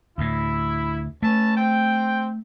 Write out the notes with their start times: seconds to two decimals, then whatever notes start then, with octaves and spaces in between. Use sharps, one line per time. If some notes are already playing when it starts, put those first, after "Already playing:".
0.18 D2 A2 E4
1.23 A3 C#4 B4 A5
1.57 C4 G5